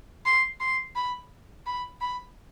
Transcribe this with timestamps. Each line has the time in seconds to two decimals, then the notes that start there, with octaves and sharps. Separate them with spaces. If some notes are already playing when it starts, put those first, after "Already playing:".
0.26 C6
0.60 C6
0.96 B5
1.66 B5
2.01 B5